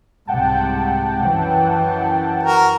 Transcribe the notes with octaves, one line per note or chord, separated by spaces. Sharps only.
C2 G#2 C3 F#5 G5 A5
F#2 E3
F#4 A#4